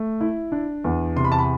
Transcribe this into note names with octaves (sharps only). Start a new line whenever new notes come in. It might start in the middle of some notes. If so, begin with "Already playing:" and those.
Already playing: A3
E4
D4
E2
C3 C6
B5
A5
B5